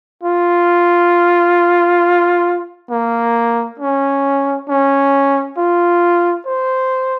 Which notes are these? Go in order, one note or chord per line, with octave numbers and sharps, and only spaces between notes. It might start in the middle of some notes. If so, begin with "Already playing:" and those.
F4
A#3
C#4
C#4
F4
C5